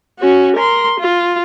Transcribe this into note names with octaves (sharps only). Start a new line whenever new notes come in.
C#4 F#4
A#4 C6
F4